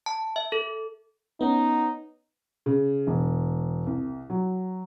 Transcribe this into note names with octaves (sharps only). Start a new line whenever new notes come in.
A5
E5
A4
B3 C#4 D#4
C#3
E1
C2
F#3